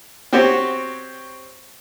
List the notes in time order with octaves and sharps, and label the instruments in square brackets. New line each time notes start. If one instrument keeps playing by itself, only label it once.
[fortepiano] C4 F#4 G4 C5 C#5